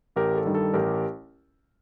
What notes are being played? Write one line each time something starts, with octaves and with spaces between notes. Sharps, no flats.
A1 G4 A#4
A4
G2 D#3 G3
A4
A1 G4 A#4